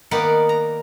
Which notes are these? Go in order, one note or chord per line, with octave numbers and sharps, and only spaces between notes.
D#3 A#3 B3 D#4 D5 F#5
A#5